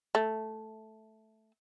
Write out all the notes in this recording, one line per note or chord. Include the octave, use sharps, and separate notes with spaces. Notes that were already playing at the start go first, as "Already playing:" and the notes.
A3